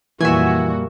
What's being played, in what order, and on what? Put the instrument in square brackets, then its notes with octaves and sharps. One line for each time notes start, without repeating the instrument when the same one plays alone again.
[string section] F2 A#2 F#4 [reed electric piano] E3 [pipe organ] G3 A#3 [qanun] E5 G#5